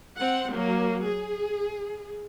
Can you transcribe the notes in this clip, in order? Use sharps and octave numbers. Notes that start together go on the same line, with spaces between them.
C4 F#5
F#3 A#3
G#4